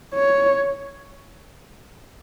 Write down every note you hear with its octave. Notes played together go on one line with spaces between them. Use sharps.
C#5